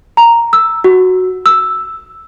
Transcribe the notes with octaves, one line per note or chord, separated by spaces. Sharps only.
A#5
E6
F#4
E6